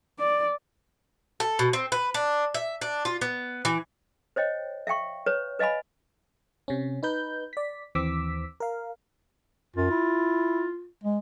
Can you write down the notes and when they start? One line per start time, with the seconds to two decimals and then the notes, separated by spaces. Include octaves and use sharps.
0.19 D5
1.40 A4
1.59 B2
1.73 C4
1.92 B4
2.14 D4
2.54 E5
2.81 D4
3.05 F4
3.21 B3
3.65 E3
4.36 C5 C#5 D#5 G5
4.87 E5 F5 G5 C#6
5.26 B4 C#5
5.59 B4 D#5 F5 G#5 B5
6.68 C3 C#4
7.03 D#4 B4 G6
7.53 D5 B6
7.95 D#2 E3 C4 D6 E6 B6
8.60 A#4 F5
9.76 F#2 F4
9.91 E4
11.04 G#3